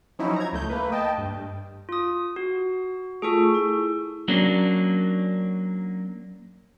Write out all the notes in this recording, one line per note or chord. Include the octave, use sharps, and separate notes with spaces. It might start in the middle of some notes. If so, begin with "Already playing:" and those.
F3 F#3 C#4 D#4 E4
A#5 G#6
C#2 A3 G6
A3 A#3 B4
D#5 G5 A5
G2
F4 D#6
F#4
A3 F4 G#4 A4 C#6
E4
F#3 A#3 C#4 D4